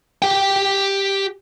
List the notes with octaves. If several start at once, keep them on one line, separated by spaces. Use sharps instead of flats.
G4 G5